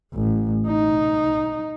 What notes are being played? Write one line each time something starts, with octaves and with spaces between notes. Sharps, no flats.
A1
D#4